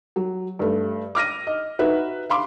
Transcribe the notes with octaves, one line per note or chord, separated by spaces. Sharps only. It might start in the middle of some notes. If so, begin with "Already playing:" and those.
F#3
G2 A3
D6 F6 A#6 D#7
D#5
D#4 F#4 B4 E5
F5 B5 C6 D6